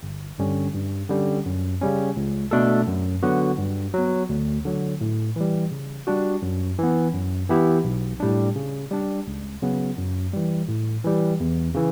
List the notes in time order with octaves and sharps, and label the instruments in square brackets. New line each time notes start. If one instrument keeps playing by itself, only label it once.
[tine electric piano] G1
G2 D3 G3 C#4
G2
D3 G3 C#4
F#2
C#3 G3 C#4
C#2
B2 A3 D4 A4
F#2
D3 F#3 B3 F#4
G2
F#3 B3
D2
D3 F#3
A2
E3 G3
C#3
G3 D4 F#4
F#2
E3 B3
F#2
E3 B3 E4 G4
B1
A2 G3 D4
C#3
G3 D4
C#2
C#3 F#3 B3
F#2
E3 G3
A2
E3 G3
E2
C#3 E3